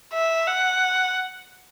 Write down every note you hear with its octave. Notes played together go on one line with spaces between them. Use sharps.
E5
F#5